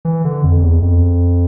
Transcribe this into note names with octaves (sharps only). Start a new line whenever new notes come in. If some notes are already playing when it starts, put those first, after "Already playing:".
E3
D3
F2
E2
F2